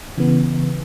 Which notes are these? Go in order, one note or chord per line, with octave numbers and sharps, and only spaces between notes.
C#3 E3 B3